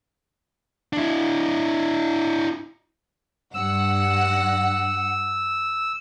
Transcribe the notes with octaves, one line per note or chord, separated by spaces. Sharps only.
D4 E4
G2 F#5 E6